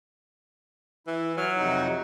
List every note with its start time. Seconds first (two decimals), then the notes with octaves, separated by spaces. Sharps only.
1.07 E3 E4
1.37 F#3 F6
1.58 F2 C3 D#4